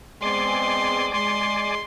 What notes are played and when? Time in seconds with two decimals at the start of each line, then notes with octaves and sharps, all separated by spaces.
0.22 G#3 B3 C4 D5 G#5 C6 D6
1.14 G#3 C6